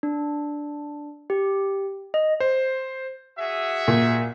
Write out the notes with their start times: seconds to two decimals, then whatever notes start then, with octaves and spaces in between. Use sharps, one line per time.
0.03 D4
1.30 G4
2.14 D#5
2.40 C5
3.38 F#4 G#4 E5
3.88 A#2